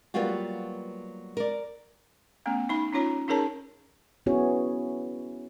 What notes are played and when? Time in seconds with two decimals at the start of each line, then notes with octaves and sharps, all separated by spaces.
0.14 F#3 G3 A#3 B3 F4 F#4
1.37 A#4 D5
2.46 A3 B3 C#4
2.69 D#4 B5
2.93 C#4 D#4 F4 C#5 A#5
3.28 C#4 D#4 G#4 A#4 C#5 A5
4.26 B3 C#4 E4 F#4 G#4 C#5